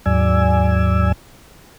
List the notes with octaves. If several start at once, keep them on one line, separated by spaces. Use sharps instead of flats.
D#2 G#2 F#3 D5 G#5 E6